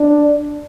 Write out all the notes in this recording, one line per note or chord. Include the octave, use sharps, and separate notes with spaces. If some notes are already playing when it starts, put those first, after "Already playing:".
Already playing: D4